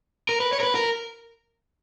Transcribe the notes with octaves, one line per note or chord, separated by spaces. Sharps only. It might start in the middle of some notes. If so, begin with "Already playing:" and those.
A#4
B4
C#5
A#4
B4
A#4